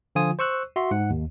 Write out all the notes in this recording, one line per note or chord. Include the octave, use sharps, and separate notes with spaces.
D3 F3 F4 G#5 D#6
C5 C#6 E6 F#6
F#4 E5 C6
G#2 F#5
D#2